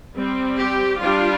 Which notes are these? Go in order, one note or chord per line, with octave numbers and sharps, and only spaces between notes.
G3 C4
G4
G3 D4 F4